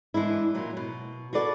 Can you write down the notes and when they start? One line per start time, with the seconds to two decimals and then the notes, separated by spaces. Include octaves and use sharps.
0.14 E3 G#3 D4 E4
0.55 A#2 F#3
0.77 B2
1.33 F#4 G#4 A4 B4 D5